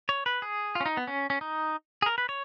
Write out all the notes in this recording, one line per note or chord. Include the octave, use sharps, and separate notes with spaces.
C#5
B4
G#4
F4
C#4
D#4
B3
C#4
C#4
D#4
G#4
A#4
B4
C#5